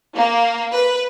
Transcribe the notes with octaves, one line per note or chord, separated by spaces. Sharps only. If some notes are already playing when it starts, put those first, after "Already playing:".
A#3
B4